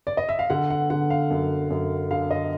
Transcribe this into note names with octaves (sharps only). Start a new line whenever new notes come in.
D5
D#5
E5
F5
D3 F#5
F#5
D3 F#5
F5
F#2
F#2
D3 F5
D#5